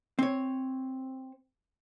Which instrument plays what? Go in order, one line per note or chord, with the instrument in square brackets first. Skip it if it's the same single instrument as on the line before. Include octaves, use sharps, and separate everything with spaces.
[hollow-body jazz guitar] C4 C#5